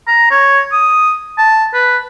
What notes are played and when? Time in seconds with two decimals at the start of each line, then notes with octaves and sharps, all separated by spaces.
0.07 A#5
0.31 C#5
0.72 D#6
1.38 A5
1.74 B4